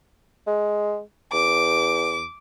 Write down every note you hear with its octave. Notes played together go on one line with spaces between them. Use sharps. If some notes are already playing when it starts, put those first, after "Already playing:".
G#3
E2 D6